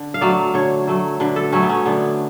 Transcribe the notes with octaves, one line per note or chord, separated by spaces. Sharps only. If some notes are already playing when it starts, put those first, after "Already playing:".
Already playing: D3
F5
F#3 A3 D5
D3 C#5
F#3 A3
D3 B4
A4
F#3 A3 C#4
B3
C#4
D3 B3